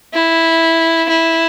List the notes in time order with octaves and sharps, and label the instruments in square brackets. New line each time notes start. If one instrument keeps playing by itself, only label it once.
[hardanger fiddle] E4
E4